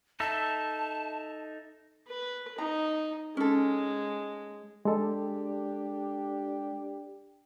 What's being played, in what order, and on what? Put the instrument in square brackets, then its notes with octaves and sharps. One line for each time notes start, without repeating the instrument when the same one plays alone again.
[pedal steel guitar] D#4 A4 E5 [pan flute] A5
[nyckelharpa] B4
[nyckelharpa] D#4 [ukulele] A#5
[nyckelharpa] G#3 [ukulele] C#4 A4
[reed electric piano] G#3 A4 [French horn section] D4 G4